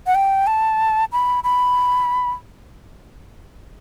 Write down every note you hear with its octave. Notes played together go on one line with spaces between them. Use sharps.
F#5
G5
A5
B5
B5